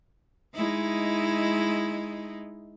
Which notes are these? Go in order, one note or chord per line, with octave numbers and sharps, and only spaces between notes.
G#3 D#4 E4